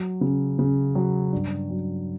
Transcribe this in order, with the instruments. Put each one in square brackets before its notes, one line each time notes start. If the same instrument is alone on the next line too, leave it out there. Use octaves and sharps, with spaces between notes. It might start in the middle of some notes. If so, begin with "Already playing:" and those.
Already playing: [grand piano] F#3
C#3
C#3
F#3
G2
F#3